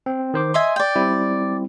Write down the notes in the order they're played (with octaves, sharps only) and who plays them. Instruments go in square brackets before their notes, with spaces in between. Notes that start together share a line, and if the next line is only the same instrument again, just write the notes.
[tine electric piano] C4
D#3 C5 D6
[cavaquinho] D#5 E5 G#5 [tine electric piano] C6
[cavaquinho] D5 G5
[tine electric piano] G3 C4 E4